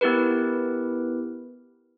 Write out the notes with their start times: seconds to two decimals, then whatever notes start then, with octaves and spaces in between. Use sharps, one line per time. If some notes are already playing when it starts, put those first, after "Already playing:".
0.01 B3 E4 G4 A#4 B4